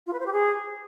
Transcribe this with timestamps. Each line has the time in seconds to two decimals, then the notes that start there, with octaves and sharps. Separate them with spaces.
0.07 F4
0.13 B4
0.20 C5
0.26 G4
0.33 G#4